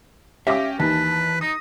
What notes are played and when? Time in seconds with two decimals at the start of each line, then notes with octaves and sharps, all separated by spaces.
0.47 C#4 G4 C#5 E5 F5 D6 A#6
0.80 D#2 E3 B4 A5
1.41 D#4 D#6 A#6